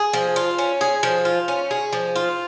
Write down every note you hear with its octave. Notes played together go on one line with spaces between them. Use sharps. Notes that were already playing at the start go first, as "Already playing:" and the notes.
Already playing: G#4
F3
F4
C#4
G#4
F3
F4
C#4
G#4
F3
F4